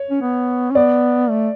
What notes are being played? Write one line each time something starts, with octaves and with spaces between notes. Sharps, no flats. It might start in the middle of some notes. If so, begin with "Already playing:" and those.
Already playing: C#5
C#4
B3
C#4
B3 D5
A3